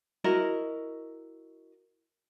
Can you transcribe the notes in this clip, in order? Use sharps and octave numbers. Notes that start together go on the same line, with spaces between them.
E4 F#4 A#4 D#5